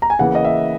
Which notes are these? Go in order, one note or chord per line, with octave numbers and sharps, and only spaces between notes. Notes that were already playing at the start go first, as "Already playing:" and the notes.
A#5
G#5
C#3 E3 A#3 F#5
D#5
E5